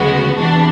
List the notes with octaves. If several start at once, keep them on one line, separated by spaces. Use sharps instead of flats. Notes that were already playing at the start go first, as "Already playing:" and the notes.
Already playing: D2 C#3 F3 G#3 B3 F#4
E2 C3 E3 D4